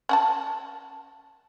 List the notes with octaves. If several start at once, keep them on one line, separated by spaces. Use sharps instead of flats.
C#4 F#5 A5